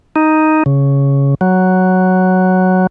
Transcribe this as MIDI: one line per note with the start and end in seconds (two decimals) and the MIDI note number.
0.16 0.63 63
0.66 1.35 49
1.41 2.87 54